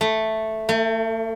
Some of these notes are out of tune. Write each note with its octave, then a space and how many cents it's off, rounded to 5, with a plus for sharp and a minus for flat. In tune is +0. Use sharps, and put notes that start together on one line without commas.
A3 +0
A3 +40